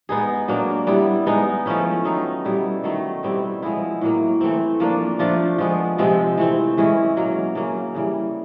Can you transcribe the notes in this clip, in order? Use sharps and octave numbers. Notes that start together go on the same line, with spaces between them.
G#3 B3 D#4 G#4
F#3 A#3 D4
G3 B3 E4
G#3 B3 D#4
F3 A3 C#4 E4
D#3 F#3 B3 D#4
B2 G3 B3 E4
D#3 F#3 A3
B2 G3 C4 E4
F3 G#3 B3 E4
A2 F#3 A#3
E3 A3 C4
F3 A#3 D4
F3 A3 D4 F4
F3 G#3 B3
C3 F3 G#3 C4
E3 A3 C4
E3 G#3 C#4 E4
B2 F#3 A#3
C#3 F#3 A#3 C#4
C#3 E3 G3